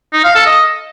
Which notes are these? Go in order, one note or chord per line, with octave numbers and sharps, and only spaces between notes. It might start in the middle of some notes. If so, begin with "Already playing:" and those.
D#4
F5
A4
D#5